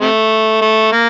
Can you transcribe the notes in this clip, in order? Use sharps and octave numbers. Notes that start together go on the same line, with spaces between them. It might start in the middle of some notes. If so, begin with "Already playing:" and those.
C3 A3
A3
A#3